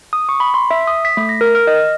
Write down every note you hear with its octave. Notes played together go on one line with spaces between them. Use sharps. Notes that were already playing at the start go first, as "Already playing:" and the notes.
D#6
C#6
B5
C6
E5
D#6
B6
A3
A#6
A#4
F6
D#5